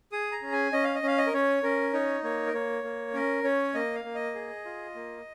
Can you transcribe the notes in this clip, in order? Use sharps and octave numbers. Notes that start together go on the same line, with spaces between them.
G#4 D#6
A#5
C#4
G#5
C#4 D#5
F5
D#5
C#4 F5
D#5
A#4
C#4 C#5
C#4 A#4
D#4 C#5
A#3 C#5
A#4
A#3 C#5
A#3
C#4 A#4
C#4 C#5
A#3 D#5
F5
A#3
D#5
G#4
F4
A#3